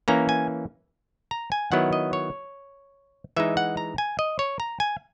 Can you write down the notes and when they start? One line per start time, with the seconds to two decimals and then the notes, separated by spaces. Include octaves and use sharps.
0.08 E3 A#3 C#4 A#5
0.29 G#5
1.31 A#5
1.52 G#5
1.72 D#3 F#3 B3 E4 F#5
1.93 D#5
2.13 C#5
3.37 E3 G#3 D#4 E5
3.57 F#5
3.77 A#5
3.98 G#5
4.19 D#5
4.39 C#5
4.60 A#5
4.80 G#5